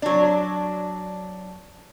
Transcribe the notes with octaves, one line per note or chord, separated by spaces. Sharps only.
F#3 D4